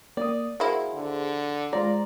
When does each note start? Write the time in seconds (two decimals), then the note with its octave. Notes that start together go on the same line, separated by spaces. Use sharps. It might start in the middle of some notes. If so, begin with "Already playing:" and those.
0.17 A#3 D5 D#6
0.60 F#3 A#3 E4 G#4 C5
0.94 D3
1.73 G#3 F4 C5 D5 A#5